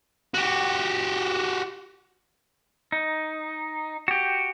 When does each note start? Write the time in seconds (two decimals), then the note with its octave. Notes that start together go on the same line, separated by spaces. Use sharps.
0.34 F#4 G4
2.92 D#4
4.08 F#4 G4